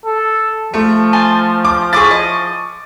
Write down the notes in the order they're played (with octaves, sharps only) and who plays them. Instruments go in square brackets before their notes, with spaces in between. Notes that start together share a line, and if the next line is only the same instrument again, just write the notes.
[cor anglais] A4
[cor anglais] F3 [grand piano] A3
[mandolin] G#5 A5 C6
[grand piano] D6
[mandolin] E4 G#4 [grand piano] C#6 D6 A6
[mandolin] D#5